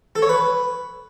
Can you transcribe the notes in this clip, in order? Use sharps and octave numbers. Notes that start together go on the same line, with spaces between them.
A4
C#5
B4